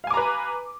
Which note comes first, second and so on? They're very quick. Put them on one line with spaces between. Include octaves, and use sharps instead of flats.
F5 G#5 D6 A#5 B4